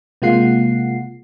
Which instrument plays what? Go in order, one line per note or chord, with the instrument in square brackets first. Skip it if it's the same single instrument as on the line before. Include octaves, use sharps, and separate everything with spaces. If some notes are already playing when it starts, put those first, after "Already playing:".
[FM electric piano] C3 G#3 A#3 F4 F#5 C7